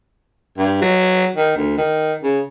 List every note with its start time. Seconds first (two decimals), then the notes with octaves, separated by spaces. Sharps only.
0.58 G2
0.81 F#3
1.36 D#3
1.56 D2
1.77 D#3
2.23 C#3